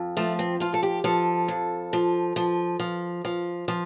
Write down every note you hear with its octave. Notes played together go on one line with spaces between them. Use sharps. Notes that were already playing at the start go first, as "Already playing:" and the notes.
Already playing: F2
F3 A3
C4
F3 F4
A4
G4
F3 A4
F2
F3
F3
F3
F3
F3